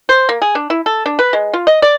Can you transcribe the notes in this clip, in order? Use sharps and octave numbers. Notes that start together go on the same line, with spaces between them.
C5
A#3
G#4
D4
E4
A4
D4
B4
G#3
F4
D#5
D5